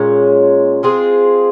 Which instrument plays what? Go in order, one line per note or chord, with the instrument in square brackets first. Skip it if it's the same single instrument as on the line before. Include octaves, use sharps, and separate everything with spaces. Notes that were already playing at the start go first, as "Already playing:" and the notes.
Already playing: [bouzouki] A#2 G#3 C#4
G#3 C4 F4 G#4